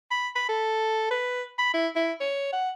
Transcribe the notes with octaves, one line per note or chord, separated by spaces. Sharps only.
B5
B5
A4
B4
B5
E4
E4
C#5
F#5